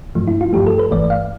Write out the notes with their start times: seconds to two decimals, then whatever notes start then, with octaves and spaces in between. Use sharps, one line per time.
0.15 G2 F3 A3
0.28 E4
0.41 F4
0.53 G2 F3 A3 G4
0.66 A4
0.79 B4
0.91 G1 G2 E3 A3 D5
1.10 F5